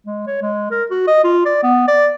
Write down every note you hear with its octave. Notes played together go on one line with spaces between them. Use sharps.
G#3
C#5
G#3
A#4
F#4
D#5
F4
D5
B3
D5